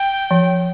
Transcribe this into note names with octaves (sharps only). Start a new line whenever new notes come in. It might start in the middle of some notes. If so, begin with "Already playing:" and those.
Already playing: G5
F3